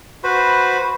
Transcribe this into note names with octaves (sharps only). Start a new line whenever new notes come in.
F#4 B4 C5 B5